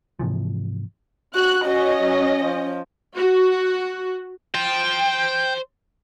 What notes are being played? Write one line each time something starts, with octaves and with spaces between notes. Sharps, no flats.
G#2 C3 E3 F3
F#4 F#6
C#4 F#4 D#5
F#3
F3
F#4
C5 G5 A5